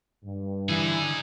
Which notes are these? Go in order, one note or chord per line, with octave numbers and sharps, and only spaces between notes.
G2
D3 E3 D#4 G#4